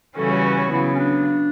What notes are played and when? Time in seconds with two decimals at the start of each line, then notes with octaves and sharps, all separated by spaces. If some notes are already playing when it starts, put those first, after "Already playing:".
0.17 C#3 E3 G3 C#4 F#4 A4
0.31 C#5
0.44 B4
0.58 C#5
0.72 C#3 F#3 B3 E4
0.95 C#4
0.99 D4